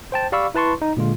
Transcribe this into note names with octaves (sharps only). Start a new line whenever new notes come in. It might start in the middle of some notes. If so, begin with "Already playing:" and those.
C5 G5 A5
G4 D5 F5 B5 C#6 E6
E4 B4 A5 C6 C#6
D#4
A#2 D3 G#3 F4